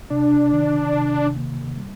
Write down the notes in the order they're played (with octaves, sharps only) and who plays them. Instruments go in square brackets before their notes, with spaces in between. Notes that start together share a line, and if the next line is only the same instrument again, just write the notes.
[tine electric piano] C3 [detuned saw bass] D4
[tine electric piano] D#3
C3
A#3
G3